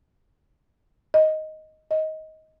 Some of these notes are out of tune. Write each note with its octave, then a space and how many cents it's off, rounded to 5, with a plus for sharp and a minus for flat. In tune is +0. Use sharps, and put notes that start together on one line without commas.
D#5 +5
D#5 +15